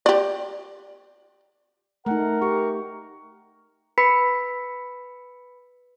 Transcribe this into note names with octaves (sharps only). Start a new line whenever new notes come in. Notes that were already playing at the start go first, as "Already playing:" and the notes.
G4 D5
A3 D#4 A#4 F#5
G4 C#6
B4 B5 B6 C#7